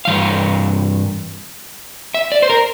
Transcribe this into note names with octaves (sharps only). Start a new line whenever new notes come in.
G2 E3 F5
E5
D5
C5
A#4